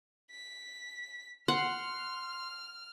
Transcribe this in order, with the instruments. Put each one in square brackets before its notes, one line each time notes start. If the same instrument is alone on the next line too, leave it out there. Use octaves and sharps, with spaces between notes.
[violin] B6
[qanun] F#5 [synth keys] C6 [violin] F6